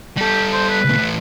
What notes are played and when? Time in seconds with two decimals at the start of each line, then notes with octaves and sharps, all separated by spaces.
0.17 G3 G4 A4
0.52 C5
0.69 B4
0.85 C#2 A#2
0.98 A2 E3